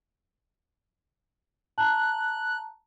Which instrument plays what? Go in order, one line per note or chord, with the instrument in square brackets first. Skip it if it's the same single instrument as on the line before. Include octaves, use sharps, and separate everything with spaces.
[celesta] A5 A#5 [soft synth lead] F#6